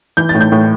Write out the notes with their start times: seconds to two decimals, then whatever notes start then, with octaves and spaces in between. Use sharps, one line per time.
0.17 E3 G6
0.29 A6
0.35 A2
0.41 G6
0.52 A2